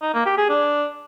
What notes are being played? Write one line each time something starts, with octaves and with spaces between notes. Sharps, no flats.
D#4
A#3
G4
G#4
D4